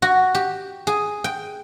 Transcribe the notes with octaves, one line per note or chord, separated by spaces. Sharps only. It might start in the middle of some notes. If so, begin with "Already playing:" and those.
F#4
G4
G#4
G5